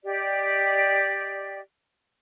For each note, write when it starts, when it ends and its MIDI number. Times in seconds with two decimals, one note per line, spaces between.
0.04 1.59 67
0.04 1.59 74
0.04 1.59 75